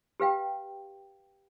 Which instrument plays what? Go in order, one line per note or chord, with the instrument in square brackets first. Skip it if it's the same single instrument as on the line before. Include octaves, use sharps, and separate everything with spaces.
[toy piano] G4 B4 F5 G5